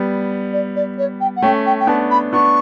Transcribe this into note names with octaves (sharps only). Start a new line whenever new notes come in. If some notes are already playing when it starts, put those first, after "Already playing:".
Already playing: G3 B3
D5
D5
C#5
G5
F#5
A3 C#4 G5
G5
G5
B3 D4 A5
B5
B3 D4 C#6